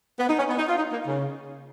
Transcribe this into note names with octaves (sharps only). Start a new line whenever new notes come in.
B3
D#4
C#4
B3
D#4
F4
D#4
A#3
C#3